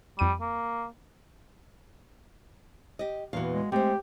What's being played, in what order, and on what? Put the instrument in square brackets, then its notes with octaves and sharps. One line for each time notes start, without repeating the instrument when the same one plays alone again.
[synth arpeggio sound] F2 D#7 [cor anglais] G3
[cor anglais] A#3
[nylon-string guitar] G4 D#5
[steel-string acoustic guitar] E2 A#2 E3 [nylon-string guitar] F#4 F5
[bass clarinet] G#3
[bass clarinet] G#3 [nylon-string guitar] A3 C5 [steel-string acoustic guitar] C4 [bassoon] G4